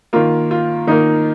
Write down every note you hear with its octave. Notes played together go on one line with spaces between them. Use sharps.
D#3 A#3 F4
F4
D#3 A#3 D#4